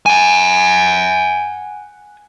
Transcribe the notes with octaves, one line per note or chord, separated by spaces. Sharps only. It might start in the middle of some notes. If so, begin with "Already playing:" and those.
F#5 G#5